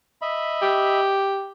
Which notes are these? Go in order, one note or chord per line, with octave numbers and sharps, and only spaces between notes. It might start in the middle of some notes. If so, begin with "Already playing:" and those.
D#5 E5 B5
G4